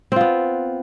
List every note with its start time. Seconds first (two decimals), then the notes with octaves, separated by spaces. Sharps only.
0.12 C4
0.16 F4
0.21 B3